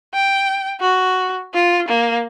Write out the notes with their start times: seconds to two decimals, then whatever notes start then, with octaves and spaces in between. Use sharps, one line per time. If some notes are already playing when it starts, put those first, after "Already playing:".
0.14 G5
0.80 F#4
1.54 F4
1.88 A#3